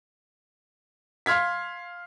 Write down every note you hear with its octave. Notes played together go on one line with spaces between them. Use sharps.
F5 C6 F6 G#6 B6